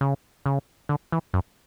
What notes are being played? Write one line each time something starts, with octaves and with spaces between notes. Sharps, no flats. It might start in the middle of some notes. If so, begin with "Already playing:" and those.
C#3
C#3
D3
E3
F#2